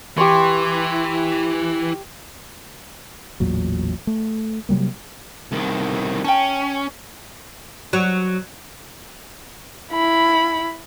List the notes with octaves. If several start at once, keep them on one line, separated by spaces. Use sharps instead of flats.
E3 G4 C6 C#6
A1 E2 A#2 F#3
A3
C3 F#3 G3 A#3
C2 D#3
C#4 G5 A5
F#3
E4 B5